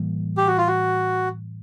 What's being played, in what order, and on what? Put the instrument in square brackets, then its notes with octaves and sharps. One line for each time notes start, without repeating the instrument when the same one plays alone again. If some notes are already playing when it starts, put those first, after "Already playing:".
Already playing: [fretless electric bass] A2 E3 G3 A#3
[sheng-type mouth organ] G4
F#4
F4
F#4